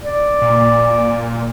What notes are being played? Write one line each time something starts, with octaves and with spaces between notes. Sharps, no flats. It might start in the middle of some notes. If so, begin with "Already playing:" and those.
D5
A#2